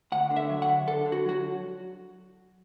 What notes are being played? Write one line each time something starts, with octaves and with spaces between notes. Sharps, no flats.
D2 F#5
D3
E5
F#3
F#5
D3
D3 A4
D3
F#4
F#3 F#4